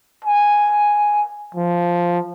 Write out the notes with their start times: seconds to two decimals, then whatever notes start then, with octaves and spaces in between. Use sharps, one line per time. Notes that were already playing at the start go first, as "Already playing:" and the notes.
0.25 G#5
1.55 F3